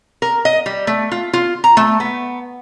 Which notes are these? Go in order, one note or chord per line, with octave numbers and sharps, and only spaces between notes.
A#4
D#5
G3
A3
F4
F4
A#5
A3
B3